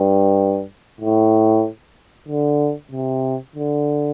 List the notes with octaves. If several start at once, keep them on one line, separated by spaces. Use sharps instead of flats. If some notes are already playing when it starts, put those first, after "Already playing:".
Already playing: G2
A2
D3
C3
D3